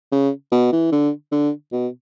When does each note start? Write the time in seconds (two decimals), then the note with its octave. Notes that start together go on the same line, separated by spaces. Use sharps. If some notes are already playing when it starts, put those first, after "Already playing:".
0.12 C#3
0.52 B2
0.72 E3
0.92 D3
1.32 D3
1.72 B2